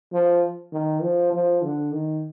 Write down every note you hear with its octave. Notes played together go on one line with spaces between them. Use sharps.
F3
D#3
F3
F3
D3
D#3